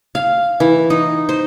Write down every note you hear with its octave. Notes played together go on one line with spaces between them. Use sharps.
F5
E3
D#4
C5